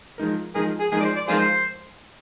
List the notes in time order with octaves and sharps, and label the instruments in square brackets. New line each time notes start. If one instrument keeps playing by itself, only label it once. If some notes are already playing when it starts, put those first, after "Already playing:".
[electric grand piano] F3 G#3 D#4 A#4
[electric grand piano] F3 G#3 D#4 A#4 [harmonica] G#4
[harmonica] G#4
[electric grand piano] F3 G#3 D#4 A#4 [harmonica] G#4
[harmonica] D5
C5
D5
[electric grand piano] F3 G#3 D#4 A#4 [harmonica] F4 G#4 C5